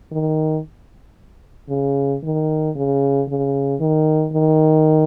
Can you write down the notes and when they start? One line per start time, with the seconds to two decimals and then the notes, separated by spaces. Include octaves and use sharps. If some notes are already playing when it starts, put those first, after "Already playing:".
0.12 D#3
1.69 C#3
2.23 D#3
2.76 C#3
3.28 C#3
3.80 D#3
4.33 D#3